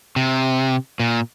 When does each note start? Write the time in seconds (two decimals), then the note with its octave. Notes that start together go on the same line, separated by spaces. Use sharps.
0.16 C3
1.00 A#2